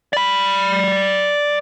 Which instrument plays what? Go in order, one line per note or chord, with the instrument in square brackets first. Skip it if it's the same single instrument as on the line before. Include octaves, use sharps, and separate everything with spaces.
[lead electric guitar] D5 B5